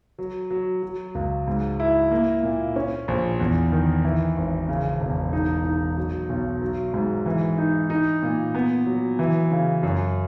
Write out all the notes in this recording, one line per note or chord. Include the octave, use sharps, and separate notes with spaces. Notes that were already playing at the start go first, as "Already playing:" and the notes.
F#3
F#3
F#3
C#2
G#2
E4
A#3
A#2
C#4
A#1
E2
D#3
E3
G#1
C#3
E1
D#4
D#4
F#3
B1
F#3
G#2
E3
D#4
D#4
A#2
B3
F#3
E3
C#3
F#2